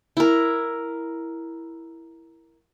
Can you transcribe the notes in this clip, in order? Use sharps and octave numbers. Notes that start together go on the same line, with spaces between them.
E4 A#4